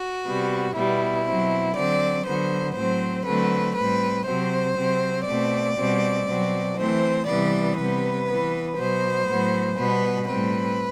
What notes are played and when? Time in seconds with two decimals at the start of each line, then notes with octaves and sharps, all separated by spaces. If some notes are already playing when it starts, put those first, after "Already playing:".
Already playing: F#4
0.26 C3 G3 B3
0.76 B2 G3 B3 E4
1.26 B2 F#3 C4
1.76 D3 F#3 C4 D5
2.26 D3 F#3 B3 C5
2.76 A2 F#3 C4 C5
3.26 D3 F#3 A3 C4 B4
3.76 A2 G3 C4 B4
4.27 C3 F#3 C4 C5
4.77 C3 F#3 C4
5.27 B2 A3 C4 D5
5.77 B2 G3 C4
6.27 B2 F#3 C4
6.77 E3 A3 C4 C5
7.27 C3 E3 G3 B3 D5
7.77 C3 G3 B3 B4
8.27 E3 B3
8.78 B2 F#3 B3 C5
9.27 A2 F#3 B3
9.78 B2 G3 B3 B4
10.28 A2 G3 C4 B4